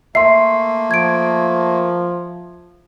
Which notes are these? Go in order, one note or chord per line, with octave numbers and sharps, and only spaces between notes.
A3 A#3 E5 C6 C7
F3 G#6 D7